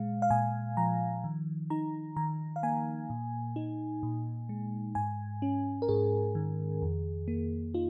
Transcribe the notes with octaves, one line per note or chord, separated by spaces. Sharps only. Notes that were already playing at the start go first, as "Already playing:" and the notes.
Already playing: A#2 G#3 F5
F5
A#2 G#5
F3 A#5
D#3
D#4 A#5
D#3 A#5
F5
A#3 G#5
A#2
D#4
A#2
G#3
G#2 G#5
C#4
A#4
G#2 G#4
D#3
F2
A#3
D#4 F4